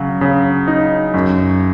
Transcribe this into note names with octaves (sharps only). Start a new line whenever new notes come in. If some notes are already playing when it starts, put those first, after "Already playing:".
Already playing: C#3 F#3
C#3
D#4
F#2